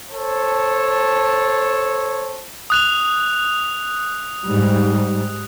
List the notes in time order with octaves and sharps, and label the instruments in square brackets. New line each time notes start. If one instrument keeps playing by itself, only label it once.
[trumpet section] A4 C5 C#5 A5
[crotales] D#6 F#6 F7
[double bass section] G#2 G3